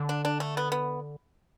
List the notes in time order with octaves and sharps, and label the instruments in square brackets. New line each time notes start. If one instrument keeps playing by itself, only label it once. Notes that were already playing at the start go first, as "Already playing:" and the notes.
Already playing: [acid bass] D3
[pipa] D4
D4
A3
B3
B3